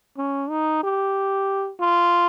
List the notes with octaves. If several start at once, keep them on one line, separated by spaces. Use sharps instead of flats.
C#4
D#4
G4
F4